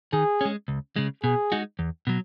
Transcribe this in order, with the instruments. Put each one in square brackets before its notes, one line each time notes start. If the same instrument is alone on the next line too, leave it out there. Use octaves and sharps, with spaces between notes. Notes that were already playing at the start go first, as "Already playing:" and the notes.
[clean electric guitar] D#3 [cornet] G#4
[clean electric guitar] G#3 C#4
C#2
C#3 G#3
[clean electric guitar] B2 [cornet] G#4
[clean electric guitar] G#3 D#4 F#4
E2
B2 F#3